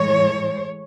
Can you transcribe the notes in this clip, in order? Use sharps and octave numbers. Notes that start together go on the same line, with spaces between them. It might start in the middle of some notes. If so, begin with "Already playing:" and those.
Already playing: A2 E3 G#3 C#5